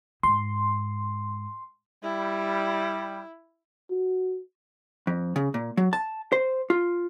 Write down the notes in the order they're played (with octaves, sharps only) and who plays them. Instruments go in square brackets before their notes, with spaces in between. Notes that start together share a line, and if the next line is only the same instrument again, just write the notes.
[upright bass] G#2 [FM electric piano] C6
[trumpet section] G3 [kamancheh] E4
[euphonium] F#4
[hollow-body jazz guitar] F2
C#3
A#2
F#3
A5
C5
F4